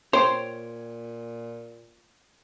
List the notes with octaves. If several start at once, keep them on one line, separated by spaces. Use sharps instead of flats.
A#2 C5 C#5 G5